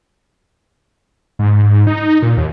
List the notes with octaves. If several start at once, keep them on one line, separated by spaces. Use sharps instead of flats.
G#2
G#2
D#4
A#2
D#2